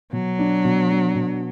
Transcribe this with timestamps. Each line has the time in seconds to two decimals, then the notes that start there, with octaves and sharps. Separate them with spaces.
0.12 B2 F#3
0.39 D4
0.65 B2
0.91 D4
1.16 B2